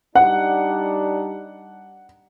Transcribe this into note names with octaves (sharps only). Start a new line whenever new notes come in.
G3 D4 D#4 F#5